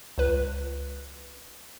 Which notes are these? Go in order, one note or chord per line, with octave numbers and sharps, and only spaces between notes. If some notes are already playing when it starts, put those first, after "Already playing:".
C#2 B4